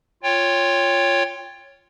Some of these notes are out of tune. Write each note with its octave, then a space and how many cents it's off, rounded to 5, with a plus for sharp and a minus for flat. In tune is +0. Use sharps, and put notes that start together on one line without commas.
F4 +0 C#5 +0 G5 +20